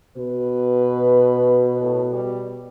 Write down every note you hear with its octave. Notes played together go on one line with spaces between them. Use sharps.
B2 B4
A2
G3